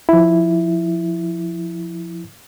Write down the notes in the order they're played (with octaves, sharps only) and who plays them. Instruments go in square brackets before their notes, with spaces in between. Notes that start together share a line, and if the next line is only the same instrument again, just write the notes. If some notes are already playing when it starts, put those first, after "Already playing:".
[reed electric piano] F3 E4